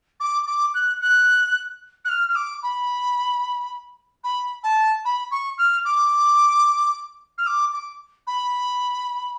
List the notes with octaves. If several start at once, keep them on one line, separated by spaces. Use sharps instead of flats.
D6
D6
F#6
F#6
F#6
F6
F6
D6
B5
B5
A5
B5
C#6
F6
D6
F6
D6
D6
B5